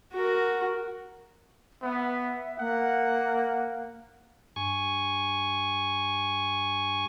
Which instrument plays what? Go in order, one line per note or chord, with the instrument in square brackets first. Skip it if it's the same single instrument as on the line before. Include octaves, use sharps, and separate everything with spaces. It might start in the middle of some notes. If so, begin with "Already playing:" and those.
[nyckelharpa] F#4 A#4
[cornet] B3 [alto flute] E5
[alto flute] A#3 [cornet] F#5
[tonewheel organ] G2 G#5 C#6